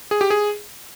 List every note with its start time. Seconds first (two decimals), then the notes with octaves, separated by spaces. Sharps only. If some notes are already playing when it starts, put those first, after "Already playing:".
0.11 G#4
0.21 G4
0.30 G#4